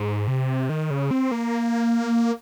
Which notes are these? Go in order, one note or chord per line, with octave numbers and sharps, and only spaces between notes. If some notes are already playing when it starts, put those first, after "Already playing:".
Already playing: G#2
C3
D#3
C#3
C4
A#3